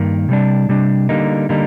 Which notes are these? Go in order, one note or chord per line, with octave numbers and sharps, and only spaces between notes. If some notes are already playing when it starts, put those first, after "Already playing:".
Already playing: G2 D#3 A#3
C3 G3 D4
C3 G3 D4
D3 G3 A#3 D#4
D3 G3 A#3 D#4